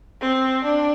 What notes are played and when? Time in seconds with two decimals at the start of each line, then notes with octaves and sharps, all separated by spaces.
0.21 C4
0.65 D4